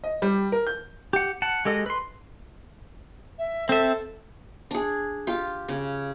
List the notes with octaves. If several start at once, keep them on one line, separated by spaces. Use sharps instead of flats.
D#5
G3
A#4
G6
G4 F#5
F#5 A5
G#3 G4 A4 D#5
B4 C6
E5
C4 A4 E5
D4 G#4
F4 G4
C#3